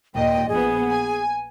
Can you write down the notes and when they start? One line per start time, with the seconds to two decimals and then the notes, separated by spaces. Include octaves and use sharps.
0.15 D#2 A#2 D#5 G5
0.49 A#1 B3 G#4
0.91 G#5